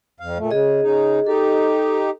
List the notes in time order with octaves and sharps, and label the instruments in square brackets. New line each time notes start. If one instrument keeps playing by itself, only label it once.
[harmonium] F2 F5
A#2 A3
[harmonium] C#3 [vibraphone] G#4 D#5
[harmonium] C#3 D#4
[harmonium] D#4 G4 [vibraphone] A4